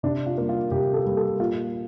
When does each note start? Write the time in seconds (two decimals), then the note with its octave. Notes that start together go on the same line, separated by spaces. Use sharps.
0.03 C3 D4
0.26 F4
0.38 G3 A#3
0.49 F4
0.71 C3 G4
0.94 A4
1.05 G3 A#3
1.17 A4
1.39 A#2 F4